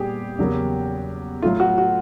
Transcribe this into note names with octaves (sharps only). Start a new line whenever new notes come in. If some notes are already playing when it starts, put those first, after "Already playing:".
Already playing: A#2 G3 B3 G4 G#4
E2 C#3 F#3 A#3 C#4
A2 F#3 A3 F4
F#4
F#4